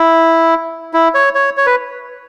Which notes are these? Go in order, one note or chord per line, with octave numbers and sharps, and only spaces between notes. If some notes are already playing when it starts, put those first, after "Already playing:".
Already playing: E4
E4
C#5
C#5
C#5
B4